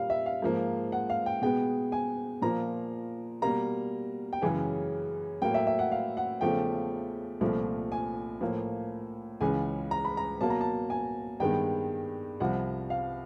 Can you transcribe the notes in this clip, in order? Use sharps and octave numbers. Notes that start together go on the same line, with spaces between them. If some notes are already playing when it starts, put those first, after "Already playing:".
Already playing: A#2 G3 A#3 F5
E5
F5
G#2 F3 A#3
F#5
F5
G5
B2 G#3 B3 G5
G#5
A#2 F3 A#3 A#5
B2 G3 A#3 A#5
G5
F#2 C#3 E3 G#3 G#5
A2 F#3 A#3 G5
E5
E5
F#5
F5
F#5
E2 C#3 F3 A3 G5
C2 A#2 F3 A3
G#5
A2 F3 A#3
C#2 C#3 E3 G#5
A#5
B5
A#5
B2 F#3 A#3 A5
A#5
A5
G#5
G2 D#3 G#3 B3 G5
C2 C3 F3 F#5
F5